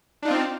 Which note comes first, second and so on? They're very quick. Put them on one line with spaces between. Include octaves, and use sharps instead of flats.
D4 D#4 F4 C4